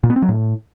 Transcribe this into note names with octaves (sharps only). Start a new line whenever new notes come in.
A#2
B3
C4
F#3
A2